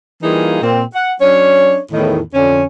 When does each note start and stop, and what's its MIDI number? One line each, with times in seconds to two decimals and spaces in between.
0.23 0.58 52
0.23 0.58 55
0.23 0.58 58
0.23 0.58 63
0.23 0.58 65
0.23 0.58 68
0.61 0.83 46
0.61 0.83 60
0.94 1.12 78
1.21 1.79 54
1.21 1.79 61
1.21 1.79 62
1.21 1.79 73
1.91 2.20 40
1.91 2.20 45
1.91 2.20 51
2.34 2.63 41
2.34 2.63 50
2.34 2.63 61